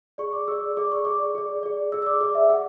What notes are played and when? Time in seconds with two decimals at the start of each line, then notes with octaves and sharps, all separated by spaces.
0.18 G#4 D5 C#6
0.33 D6
0.48 G#4 D5 E6
0.77 G#4 D5 D6
0.91 C#6
1.05 G#4 D5 D6
1.35 G#4 D5
1.63 G#4 D5
1.92 G#4 D5 E6
2.02 E6
2.06 D6
2.21 G#4 D5 D6
2.35 E5
2.49 G#4 F#5